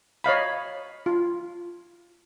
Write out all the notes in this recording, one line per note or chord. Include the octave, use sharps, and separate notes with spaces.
C#5 D#5 F5 B5
F4